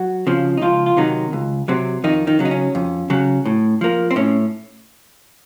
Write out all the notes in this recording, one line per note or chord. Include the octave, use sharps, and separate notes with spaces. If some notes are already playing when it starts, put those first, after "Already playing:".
Already playing: F#3 F#4
C#3 F3 C4
D#4
C#2 F3 F4
F4
C3 D#3 F#3 D#4
C#2
C3 F#3 C4
F2 D#3 D#4
D#3 D#4
C#3 F#3
D#4
C#4
F2
C#3 F#3
A2
F3 A#3
C4
A2 C#4